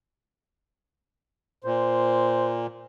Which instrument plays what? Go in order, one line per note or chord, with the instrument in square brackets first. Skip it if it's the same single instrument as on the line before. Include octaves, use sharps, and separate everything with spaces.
[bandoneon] A#2 [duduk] C5